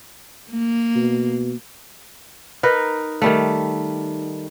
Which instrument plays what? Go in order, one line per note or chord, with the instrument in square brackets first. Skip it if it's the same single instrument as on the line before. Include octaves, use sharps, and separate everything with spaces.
[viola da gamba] A#3
[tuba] B2
[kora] D#4 A#4 B4
D#3 G3 A3